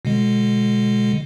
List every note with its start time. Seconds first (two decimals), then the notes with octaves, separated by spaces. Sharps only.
0.05 B2 D3 G#3